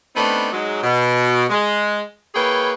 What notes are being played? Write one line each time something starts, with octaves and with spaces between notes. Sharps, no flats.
A3 B3 C4 D4 D#4 B4
G#2 F#3 G#3
B2
G#3
A#3 E4 G#4 B4 C#5 G5